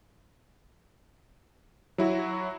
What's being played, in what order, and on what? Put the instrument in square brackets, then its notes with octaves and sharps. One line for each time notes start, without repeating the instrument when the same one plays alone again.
[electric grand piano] F#3 E4 F#4